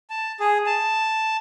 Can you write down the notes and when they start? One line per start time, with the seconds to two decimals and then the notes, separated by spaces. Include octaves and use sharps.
0.10 A5
0.40 G#4
0.66 A5